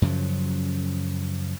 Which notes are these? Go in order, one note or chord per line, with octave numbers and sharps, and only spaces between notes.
F#2 C#3 F3 F#3